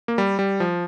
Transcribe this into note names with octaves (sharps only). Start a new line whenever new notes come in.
A#3
G3
G3
F3